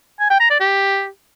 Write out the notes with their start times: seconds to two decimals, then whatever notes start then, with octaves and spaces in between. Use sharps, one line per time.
0.20 G#5
0.30 G5
0.40 A#5
0.50 D5
0.60 G4